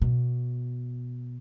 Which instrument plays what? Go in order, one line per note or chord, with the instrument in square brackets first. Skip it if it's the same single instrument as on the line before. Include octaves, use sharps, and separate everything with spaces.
[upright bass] B2